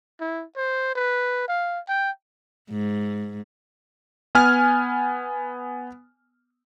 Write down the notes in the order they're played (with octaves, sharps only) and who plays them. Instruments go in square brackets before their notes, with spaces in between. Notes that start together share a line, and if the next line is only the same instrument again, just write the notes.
[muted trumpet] E4
C5
B4
F5
G5
[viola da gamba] G#2
[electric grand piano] B3 G#5 F6